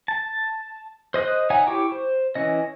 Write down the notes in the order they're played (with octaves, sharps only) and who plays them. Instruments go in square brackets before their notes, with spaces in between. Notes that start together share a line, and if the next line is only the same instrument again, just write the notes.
[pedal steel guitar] A5
C5 D#5 D#6 F#6
D#4 C#5 E5 F#5 G#5
E4 G4 G5 C#6 D6
C5
E3 C#4 D#5